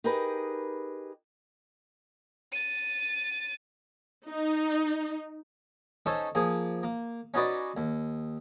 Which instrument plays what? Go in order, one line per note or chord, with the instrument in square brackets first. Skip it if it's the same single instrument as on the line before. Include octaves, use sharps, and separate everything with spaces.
[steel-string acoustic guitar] D#4 G4 G#4 A#4 B4
[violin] A6 D#7
[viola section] D#4
[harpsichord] C#4 D#4 A4 C5
F3 A#3 G#4
A#3
C#4 D#4 F#4 B4 D5 D#5
D#2